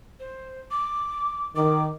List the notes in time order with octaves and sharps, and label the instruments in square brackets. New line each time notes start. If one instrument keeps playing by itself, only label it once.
[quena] C5
D6
[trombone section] D#3 [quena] D6